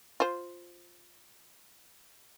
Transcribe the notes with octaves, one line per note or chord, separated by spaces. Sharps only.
F4 C5